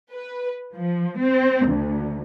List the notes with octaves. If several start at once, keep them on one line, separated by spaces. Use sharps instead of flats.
B4
F3
C4
D2